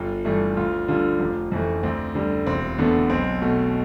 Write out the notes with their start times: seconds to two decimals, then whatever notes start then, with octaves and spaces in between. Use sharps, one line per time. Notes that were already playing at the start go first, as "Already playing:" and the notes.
Already playing: G1 F4
0.25 G2 E3 A3
0.57 D2 F4
0.88 D3 G3 F4
1.20 F1
1.52 F2 E3 A3
1.83 D2 C4
2.15 D3 G3
2.47 E1 C4
2.78 E2 D3 A3 B3
3.10 B1 C4
3.42 B2 A3